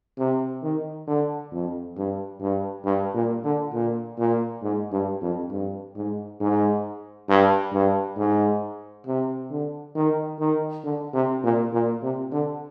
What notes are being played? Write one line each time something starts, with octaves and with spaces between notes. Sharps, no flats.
C3
D#3
D3
F2
G2
G2
G2
A#2
D3
A#2
A#2
G#2
G2
F2
G2
G#2
G#2
G2
G2
G#2
C3
D3
D#3
D#3
D3
C3
A#2
A#2
C3
D3